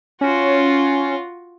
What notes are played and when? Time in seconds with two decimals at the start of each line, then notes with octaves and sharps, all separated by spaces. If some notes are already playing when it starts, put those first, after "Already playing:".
0.21 C#4 F4 F#4